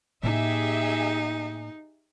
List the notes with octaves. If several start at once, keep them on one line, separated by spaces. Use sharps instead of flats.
A2 A#3 D#4 G4 G#4 E5